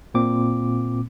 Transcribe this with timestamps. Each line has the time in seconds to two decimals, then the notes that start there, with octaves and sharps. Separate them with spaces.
0.14 A#2 A#3 C4 D6